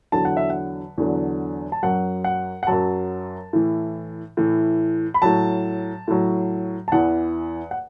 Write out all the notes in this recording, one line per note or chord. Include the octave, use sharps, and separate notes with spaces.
E2 D3 F#3 A5
F#5
E5
F#5
E2 D3 F#3
A5
F#2 F#3 F#5
F#5
F#5
F#2 F#3 A5
A2 E3
A2 E3
B5
A2 F#3 A5
A2 F#3
A5
E2 E3 F#5
F#5